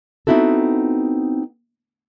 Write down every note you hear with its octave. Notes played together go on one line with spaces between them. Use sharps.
B3 C4 D#4 E4 F#4 A4